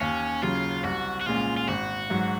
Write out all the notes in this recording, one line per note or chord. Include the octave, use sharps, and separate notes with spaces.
D#2 C#4
C#3 F#3 F4
C2 F#4
F#4
A#2 G#3 C#4 F4
F4
G#1 F#4
G#2 F#3